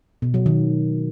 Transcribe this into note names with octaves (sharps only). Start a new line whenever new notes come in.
B2
F#3
D#3